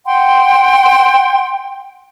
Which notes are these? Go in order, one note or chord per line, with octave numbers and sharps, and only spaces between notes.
F#5 G5 C6